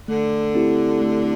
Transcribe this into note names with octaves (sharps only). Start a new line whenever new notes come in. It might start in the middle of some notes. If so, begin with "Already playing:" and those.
D3 A3
C4 E4 G4
A3